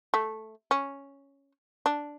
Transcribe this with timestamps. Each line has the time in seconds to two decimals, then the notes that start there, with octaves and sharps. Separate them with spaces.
0.14 A3
0.71 C#4
1.86 D4